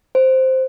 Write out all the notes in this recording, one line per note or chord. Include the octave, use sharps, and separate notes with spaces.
C5